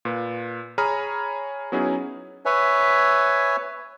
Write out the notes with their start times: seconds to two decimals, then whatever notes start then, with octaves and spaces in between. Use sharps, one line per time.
0.05 A#2 B4
0.78 G#4 C#5 A#5 B5 D#6 F6
1.72 F#3 B3 C#4 D#4 E4 G#4
2.45 B4 C#5 E5 G#5